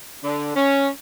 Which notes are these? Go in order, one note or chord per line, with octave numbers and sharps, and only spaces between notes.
D3
C#4